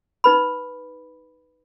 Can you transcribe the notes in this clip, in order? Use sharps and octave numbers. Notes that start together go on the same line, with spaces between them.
D#4 B4 B5